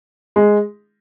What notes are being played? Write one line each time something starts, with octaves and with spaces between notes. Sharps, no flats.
G#3